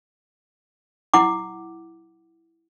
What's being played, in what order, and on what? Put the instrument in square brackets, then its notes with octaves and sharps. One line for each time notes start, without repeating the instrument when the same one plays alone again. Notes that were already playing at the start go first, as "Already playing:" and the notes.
[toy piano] E4 F#5 D6